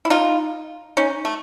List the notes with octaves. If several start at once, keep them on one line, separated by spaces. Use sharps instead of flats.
E4
D#4 F4
C#4 D#4
A3